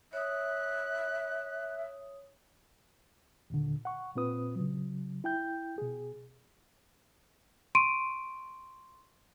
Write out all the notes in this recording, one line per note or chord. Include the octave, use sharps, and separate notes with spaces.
C#5 E5 D#6 F#6
D#2 A#2 D3
F#5 C#6
A#2 C4 F4 B4 D#6
C#3 F#3
E4 G5 G6
B2 G#4
C6 C#6 D7 D#7